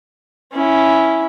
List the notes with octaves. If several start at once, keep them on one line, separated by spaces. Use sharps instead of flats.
C#4 E4